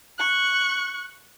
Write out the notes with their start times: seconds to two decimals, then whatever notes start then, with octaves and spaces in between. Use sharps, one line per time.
0.18 C#6 F#6